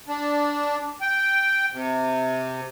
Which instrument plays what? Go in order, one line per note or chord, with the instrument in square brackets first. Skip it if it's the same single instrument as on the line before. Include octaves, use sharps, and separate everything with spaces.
[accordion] D4
G5
C3